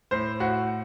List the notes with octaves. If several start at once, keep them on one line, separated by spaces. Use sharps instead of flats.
A2 C5
A2 F#4